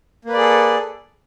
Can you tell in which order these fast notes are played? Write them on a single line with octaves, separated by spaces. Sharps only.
A#3 B4 D5 G#4 A4